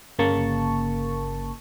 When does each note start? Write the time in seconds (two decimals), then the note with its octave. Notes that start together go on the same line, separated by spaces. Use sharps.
0.19 G1 C#3 A#3 A5 C#6